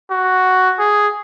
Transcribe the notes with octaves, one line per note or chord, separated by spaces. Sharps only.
F#4
G#4